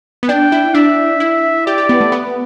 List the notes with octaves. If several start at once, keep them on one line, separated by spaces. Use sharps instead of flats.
B3
D4 G5
E4
D4 E5
E4
G4 D5
G4
B3
A3
B3